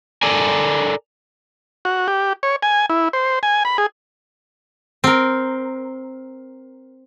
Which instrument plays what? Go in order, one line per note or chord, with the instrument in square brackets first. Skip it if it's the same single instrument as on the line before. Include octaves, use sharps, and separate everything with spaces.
[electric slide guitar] A4 A#4 D5 G#5
[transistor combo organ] F#4
G4
C#5
G#5
E4
C5
G#5
B5
G#4
[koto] C4 A#4